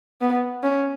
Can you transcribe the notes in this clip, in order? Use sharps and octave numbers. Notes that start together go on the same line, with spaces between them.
B3
C#4